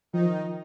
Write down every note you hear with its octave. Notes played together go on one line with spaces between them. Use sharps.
D#3 F3 D#4